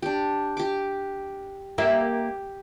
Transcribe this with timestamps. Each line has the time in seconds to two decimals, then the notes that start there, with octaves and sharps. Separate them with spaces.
0.02 D4 G4
0.57 G4 D6
1.78 A#3 G4 E5